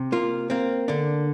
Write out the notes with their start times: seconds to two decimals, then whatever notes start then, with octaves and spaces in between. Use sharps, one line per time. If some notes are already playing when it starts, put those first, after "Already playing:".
Already playing: C3
0.12 A#3 F4
0.50 A#3 C4
0.88 D3 D4